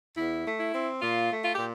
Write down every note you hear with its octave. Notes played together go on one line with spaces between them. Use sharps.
E2 E4
A3
E4
C4
A#2 F4
A3
F4
A#2 G4